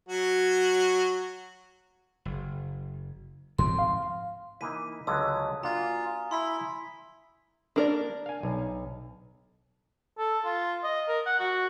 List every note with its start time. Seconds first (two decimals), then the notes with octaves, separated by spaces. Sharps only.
0.09 F#3 F#4
2.25 F#1
3.59 G#2 F3 C4 C6
3.79 F5
4.61 E3 A#3 D#4 B6 D#7
5.07 C#2 D3 F#3 D#6
5.63 A#3 D4 F4 F#4 G#5 A#5
6.31 E4 C6 E6 B6
7.76 A#3 D4 A#4 D5
8.26 F5 G#5
8.43 B1
10.19 A4
10.45 F4
10.84 D#5
11.09 A#4
11.26 F#5
11.40 F#4